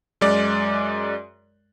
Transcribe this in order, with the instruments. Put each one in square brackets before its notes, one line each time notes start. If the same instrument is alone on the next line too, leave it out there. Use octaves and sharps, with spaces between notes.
[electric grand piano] F#2 G#3 D5